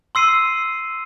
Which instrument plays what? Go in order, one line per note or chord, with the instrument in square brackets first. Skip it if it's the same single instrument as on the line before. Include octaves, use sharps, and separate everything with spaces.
[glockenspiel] C6 E6 C7 D#7